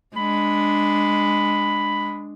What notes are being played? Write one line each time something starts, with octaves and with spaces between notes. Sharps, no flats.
G#3 D4 B5